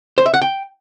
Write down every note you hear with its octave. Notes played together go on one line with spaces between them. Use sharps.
C5
E5
F#5
G5